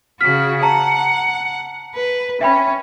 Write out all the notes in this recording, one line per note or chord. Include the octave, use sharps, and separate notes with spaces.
C#3 F#4 F6 B6
F#5 A5 A#5
B4
C#4 E5 G5 B5